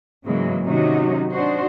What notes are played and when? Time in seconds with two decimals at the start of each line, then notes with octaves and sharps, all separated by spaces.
0.25 G#2 C#3 E3 F#3 G#3 A#3
0.65 C3 D#3 F#3 C#4 D#4 F#4
1.31 D4 D#4 F#4 C5